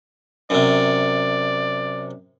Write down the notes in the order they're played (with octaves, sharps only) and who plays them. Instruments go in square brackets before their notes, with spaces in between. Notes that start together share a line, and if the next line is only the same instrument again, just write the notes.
[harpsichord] F#2 C3 [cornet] D5